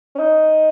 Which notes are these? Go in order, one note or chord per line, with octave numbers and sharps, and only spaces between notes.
C#4
D#4